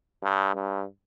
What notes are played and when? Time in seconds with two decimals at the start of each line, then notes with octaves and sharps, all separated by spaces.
0.24 G2
0.55 G2